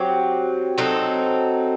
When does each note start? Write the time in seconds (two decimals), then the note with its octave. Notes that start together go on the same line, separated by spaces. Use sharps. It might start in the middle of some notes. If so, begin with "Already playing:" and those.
Already playing: F#3 C4 G4
0.78 F#3 C4 D#4 A4